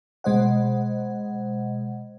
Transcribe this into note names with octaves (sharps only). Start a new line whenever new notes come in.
B2 G#3 C5 D#5 F#5